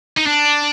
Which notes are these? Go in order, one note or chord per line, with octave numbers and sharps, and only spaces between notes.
D#4
D4